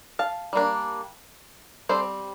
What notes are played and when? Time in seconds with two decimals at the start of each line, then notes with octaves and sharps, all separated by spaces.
0.19 F5 A5
0.53 G3 A#3 D4
1.89 G3 C4 A4 C5